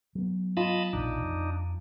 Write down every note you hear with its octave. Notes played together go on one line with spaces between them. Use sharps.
F#3 B3
F4 D#5 A5 B5
A#1 E2 B2 D4 D#4
F2